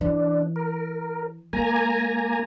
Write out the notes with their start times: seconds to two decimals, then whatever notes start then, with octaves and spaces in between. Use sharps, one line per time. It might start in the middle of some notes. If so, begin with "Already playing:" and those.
0.01 E3 D4
0.56 A#4
1.53 G#3 A#3 G#5 A#5